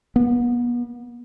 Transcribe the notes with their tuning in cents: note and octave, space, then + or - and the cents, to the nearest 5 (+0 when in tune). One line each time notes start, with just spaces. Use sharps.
B3 -35